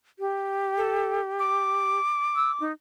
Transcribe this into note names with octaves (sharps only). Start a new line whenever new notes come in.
G4
A4
D6
E6
D#4